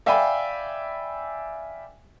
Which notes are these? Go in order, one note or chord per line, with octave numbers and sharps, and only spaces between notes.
D5 E5 F5 G5 G#5 B5